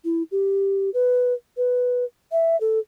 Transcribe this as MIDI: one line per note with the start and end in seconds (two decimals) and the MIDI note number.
0.05 0.23 64
0.32 0.90 67
0.94 1.33 71
1.57 2.04 71
2.32 2.59 76
2.61 2.79 69